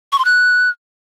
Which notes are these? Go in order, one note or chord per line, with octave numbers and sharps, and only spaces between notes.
C#6
C6
F#6